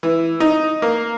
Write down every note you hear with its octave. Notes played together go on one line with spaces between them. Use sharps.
E3
D#4
A#3